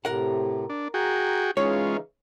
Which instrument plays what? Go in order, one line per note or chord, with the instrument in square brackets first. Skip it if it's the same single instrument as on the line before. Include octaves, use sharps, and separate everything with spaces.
[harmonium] A2 C3 [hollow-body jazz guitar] A#4 F#5
[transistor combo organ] D4
[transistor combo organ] F#4 G#4 G5 [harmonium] A#5
[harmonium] C#3 E3 D#4 [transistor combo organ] G#3 C#4 F4 [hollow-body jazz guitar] C#5